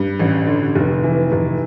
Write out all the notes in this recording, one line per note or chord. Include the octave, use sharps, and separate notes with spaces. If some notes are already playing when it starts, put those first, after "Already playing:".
Already playing: G2
A1
D3
F1
E3
F1